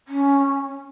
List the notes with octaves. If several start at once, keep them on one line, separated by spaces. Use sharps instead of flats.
C#4